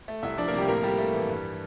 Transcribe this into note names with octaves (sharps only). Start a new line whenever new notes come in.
A3
C2 E4 E5
F3 D4 D5
A#3 A#4
C3 G3 G4
A2 A#3 A#4
A2 G3 G4
A3
E3
G2